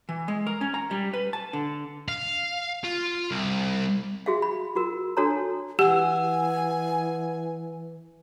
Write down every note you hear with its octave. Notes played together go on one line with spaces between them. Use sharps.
E3
G#3
A#4
C#4
A#5
G3
B4
A5
D3
F5
F4
C2
F#4 G#4 E5 F5
B5
F4 F#4 A#4
D4 F#4 A4 C#5 A5 A#5
E3 G4 F#5 G#5 E6